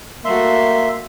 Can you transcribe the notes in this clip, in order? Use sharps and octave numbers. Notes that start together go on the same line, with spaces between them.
G3 A3 A#3 F#4 E5 C6